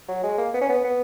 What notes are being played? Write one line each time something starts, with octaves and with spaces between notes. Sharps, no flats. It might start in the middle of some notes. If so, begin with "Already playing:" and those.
F#3
G#3
A#3
B3
C#4
B3
B3